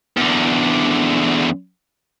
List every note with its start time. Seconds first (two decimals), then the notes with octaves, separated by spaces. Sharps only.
0.17 E2 D3